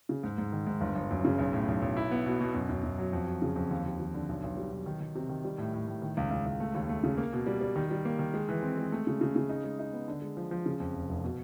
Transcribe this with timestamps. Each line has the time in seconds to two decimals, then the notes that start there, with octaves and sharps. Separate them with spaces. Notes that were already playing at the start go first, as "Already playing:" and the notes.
0.09 C#3
0.23 G#2
0.38 G#2
0.52 D#3
0.67 G#2
0.81 G1
0.95 G1
1.11 F#2
1.25 C#3
1.38 B1
1.53 A2
1.68 B1
1.82 B1
1.97 E4
2.11 B3
2.26 B2
2.41 B2
2.55 F#2
2.69 F#2
2.83 F#2
2.98 F#3
3.13 F2
3.27 F#3
3.42 C#3
3.56 F2
3.70 D#2
3.86 D#2
4.00 D#2
4.14 D3
4.29 B1
4.43 B1
4.57 G3
4.72 B1
4.86 D#3
5.01 D#3
5.15 C3
5.29 D#3
5.45 G3
5.58 A2
5.74 A2
5.88 A2
6.02 D#3
6.17 C#2
6.31 C#2
6.46 C#2
6.60 A3
6.75 D#2
6.89 A3
7.04 C#3
7.17 A#3
7.33 B2
7.46 G3
7.61 G3
7.76 D#3
7.91 G3
8.05 A#3
8.19 D#3
8.34 G#3
8.49 E3
8.63 C4
8.78 G#3
8.92 A3
9.07 C#3
9.21 C#3
9.36 C#3
9.49 D#4
9.64 G#3
9.79 D#4
9.93 B3
10.08 D3
10.22 G#3
10.37 F3
10.51 F3
10.66 C#3
10.80 F2
10.94 F1
11.09 F1
11.24 B2